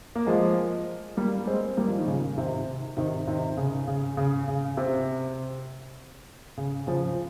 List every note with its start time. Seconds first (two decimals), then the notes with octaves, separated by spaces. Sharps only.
0.15 A#3
0.27 F3 G#3
1.17 G3 A#3
1.47 G#3 C4
1.77 G3 A#3
1.88 F3
1.99 D#3
2.07 C#3
2.37 C3 D#3
2.97 C3 D#3
3.27 C3 D#3
3.57 C#3
3.87 C#3
4.17 C#3
4.48 C#3
4.77 C3
6.57 C#3
6.87 C#3 F3